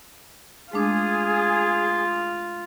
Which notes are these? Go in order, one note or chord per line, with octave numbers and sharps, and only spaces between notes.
G#3 A3 D4 F4 G#4